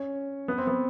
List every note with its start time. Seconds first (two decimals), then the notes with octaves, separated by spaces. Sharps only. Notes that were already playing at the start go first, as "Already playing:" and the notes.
Already playing: C#4
0.48 B3
0.58 C4
0.67 B3